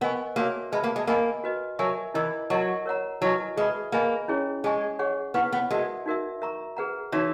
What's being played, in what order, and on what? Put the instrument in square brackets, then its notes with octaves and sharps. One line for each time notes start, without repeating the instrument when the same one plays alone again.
[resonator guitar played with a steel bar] B3 [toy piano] A#4 D#5 G#5 C#6
[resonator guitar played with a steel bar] A#3 [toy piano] F#4 A#4 C#5 E5
[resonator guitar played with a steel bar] G#3 [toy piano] B4 E5 B5
[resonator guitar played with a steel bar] A#3
G#3
[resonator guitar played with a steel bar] A#3 [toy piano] A#4 D#5 G#5 B5
[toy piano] F#4 B4 D#5
[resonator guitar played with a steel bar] F#3 [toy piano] A#4 E5 G#5 C#6
[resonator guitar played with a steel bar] E3 [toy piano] E4 A#4 D#5
[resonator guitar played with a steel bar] F#3 [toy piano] A#4 D#5 F#5 C#6
[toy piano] A#4 C#5 F#5 A#5
[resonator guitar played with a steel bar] F#3 [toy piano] E4 B4 D#5 G#5 C#6
[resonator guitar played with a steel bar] G#3 [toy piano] G#4 B4 E5 B5
[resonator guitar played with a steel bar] A#3 [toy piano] G#4 B4 D#5 G#5 B5
[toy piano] C#4 E4 G#4 C#5
[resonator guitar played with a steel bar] G#3 [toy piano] G#4 D#5 G#5 C#6
[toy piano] G#4 C#5 F#5 C#6
[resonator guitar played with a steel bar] B3 [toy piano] E4 B4 F#5 C#6
[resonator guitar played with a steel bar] B3
[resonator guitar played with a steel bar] G#3 [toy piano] F#4 A#4 E5
[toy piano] D#4 F#4 A#4 E5
A#4 E5 A#5 C#6
G#4 B4 F#5 A#5
[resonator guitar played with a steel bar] E3 [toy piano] D#4 F#4 C#5 E5